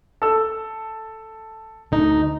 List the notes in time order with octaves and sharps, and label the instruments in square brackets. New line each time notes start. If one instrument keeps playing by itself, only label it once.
[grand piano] A4 E6
[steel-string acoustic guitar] D2 D#4